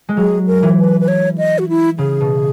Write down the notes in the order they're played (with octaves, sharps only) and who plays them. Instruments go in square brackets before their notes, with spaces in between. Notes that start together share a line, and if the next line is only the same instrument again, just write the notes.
[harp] G#3
[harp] F#3 [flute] G#4
[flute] A#4
[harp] E3
[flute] B4
B4
C#5
D#5
F#4
E4
[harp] C#3 [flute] G#4
[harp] B2